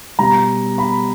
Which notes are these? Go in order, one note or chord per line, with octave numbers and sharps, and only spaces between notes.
B2 G3 A#5
B5